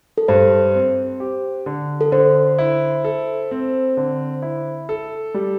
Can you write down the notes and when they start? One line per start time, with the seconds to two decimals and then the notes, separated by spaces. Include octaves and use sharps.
0.18 A4
0.28 G2 C5
0.75 C4
1.20 G4
1.66 D3
2.01 A4
2.12 D3 C5
2.59 E4
3.04 A4
3.51 C4
3.97 D3
4.42 E4
4.89 A4
5.34 G3